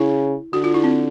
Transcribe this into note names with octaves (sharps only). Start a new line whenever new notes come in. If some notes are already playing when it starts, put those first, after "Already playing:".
Already playing: C#3 E4
D3 F#4
F4
E4
C4